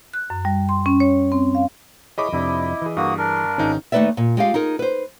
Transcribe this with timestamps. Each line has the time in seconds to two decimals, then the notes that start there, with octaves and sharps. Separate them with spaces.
0.14 F#6
0.30 F#2
0.45 G3
0.69 C6
0.86 C#4
1.00 C#5
1.32 C4
1.55 F5
2.18 E4 G#4 C#5 D#5 B5 D6
2.33 F2 C3 D4 E4
2.82 E3 G#4
2.97 G2 A#3 F#4 D#6
3.18 D4 A#4
3.58 G#1 C#4 D#4 F5 A#5
3.92 D#2 A3 D#4 B4 D5 E5
4.17 A#2
4.37 G#3 F4 G4 F5
4.54 D#4 F4 G#4 A#4
4.79 B4 C5